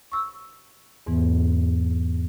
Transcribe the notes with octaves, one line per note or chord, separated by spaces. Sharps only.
C#6 E6
E2 G#2 E3 B3